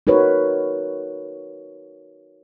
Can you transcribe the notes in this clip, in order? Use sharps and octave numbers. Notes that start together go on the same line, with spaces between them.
D#4 F#4 A#4 B4 C#5